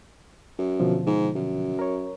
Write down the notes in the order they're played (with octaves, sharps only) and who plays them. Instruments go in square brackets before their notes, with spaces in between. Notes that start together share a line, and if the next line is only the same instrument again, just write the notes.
[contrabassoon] F#2
[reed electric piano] B2 D3 F3
[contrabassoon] G#2
F#2
[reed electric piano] A#4 C#5